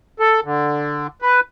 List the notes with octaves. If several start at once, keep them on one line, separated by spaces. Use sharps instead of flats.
A4
D3
B4